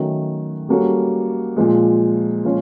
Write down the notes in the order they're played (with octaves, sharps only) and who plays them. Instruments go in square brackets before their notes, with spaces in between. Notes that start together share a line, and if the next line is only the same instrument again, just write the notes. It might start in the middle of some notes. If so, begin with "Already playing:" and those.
Already playing: [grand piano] D#3 F#3 A3 C#4 F#4
G3 A#3 C#4 F#4 A4
A#2 F3 G#3
A#2 F3 G#3 C#4 F4